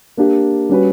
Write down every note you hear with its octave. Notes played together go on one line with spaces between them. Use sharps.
A#3 D4 G4
G3 C#4 F#4 B4